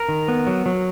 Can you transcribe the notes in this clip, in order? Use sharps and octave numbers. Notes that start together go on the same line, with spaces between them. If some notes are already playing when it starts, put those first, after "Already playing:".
Already playing: A#4
D#3
B3
F#3
F#3